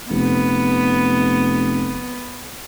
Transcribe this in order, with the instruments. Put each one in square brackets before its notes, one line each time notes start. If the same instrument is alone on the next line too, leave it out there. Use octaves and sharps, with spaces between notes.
[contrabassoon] F1 [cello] B3